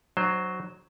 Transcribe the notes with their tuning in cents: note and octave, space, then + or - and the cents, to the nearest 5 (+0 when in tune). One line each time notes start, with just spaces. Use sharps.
F#3 +0 D4 +45 C5 +0